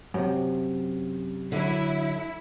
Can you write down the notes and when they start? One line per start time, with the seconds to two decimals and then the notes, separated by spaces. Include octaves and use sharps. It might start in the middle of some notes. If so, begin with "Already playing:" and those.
0.14 F#2 A2 C3
1.52 D3 F#3 E4